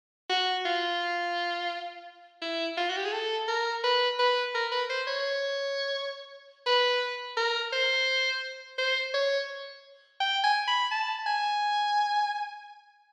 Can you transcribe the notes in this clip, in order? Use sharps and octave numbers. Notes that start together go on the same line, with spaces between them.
F#4
F4
E4
F4
F#4
G4
G#4
A4
A#4
B4
B4
A#4
B4
C5
C#5
B4
A#4
C5
C5
C#5
G5
G#5
B5
A5
G#5